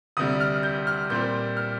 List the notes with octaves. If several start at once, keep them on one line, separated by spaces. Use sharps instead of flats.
D2 C3 G3 D#6
F6
G6
F6
A#2 G3 C4 G6
F6